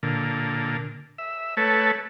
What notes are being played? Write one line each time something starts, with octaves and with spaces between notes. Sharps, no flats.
A#2 D3
E5
A3 A4 B4 C#5